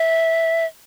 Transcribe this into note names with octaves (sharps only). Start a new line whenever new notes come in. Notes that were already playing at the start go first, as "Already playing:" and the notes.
Already playing: E5